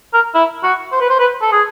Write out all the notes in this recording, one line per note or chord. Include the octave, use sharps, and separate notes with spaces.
A#4
E4
F#4
C5
B4
C5
B4
A4
G#4